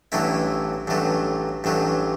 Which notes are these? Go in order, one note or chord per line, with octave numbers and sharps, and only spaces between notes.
A1 G2 F#3 A3 E4
A1 G2 F#3 A3
A1 G2 F#3 A3